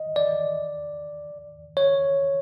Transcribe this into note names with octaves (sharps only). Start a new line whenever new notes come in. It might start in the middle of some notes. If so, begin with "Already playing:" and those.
Already playing: D#5
D5
C#5